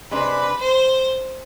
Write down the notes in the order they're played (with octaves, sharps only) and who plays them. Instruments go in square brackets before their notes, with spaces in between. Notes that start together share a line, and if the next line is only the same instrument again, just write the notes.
[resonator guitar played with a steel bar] C3 G#3 D4 [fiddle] B4
[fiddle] C5